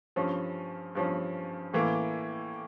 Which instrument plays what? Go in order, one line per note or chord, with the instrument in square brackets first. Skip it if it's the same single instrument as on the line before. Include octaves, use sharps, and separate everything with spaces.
[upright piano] G2 F3 C#4
G2 F3 C#4
A2 E3 A#3